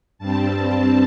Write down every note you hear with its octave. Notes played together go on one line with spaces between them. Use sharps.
G2 G3 C4 A5